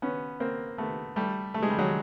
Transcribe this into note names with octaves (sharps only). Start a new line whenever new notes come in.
B3 C#4
A#3 C4
A3 B3
G3 A3
A3
G#3
G3
F#3 G#3